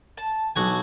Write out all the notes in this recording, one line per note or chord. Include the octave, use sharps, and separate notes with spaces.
A5
B1 F#4 G#5